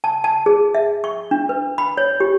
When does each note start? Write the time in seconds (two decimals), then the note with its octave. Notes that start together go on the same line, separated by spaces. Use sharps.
0.04 A5
0.24 A5
0.46 G#4
0.74 E5
1.04 C#6
1.31 D4
1.49 B4
1.78 B5
1.97 C#5
2.20 G4